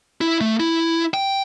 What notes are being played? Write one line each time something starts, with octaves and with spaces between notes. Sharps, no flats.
E4
A3
E4
G5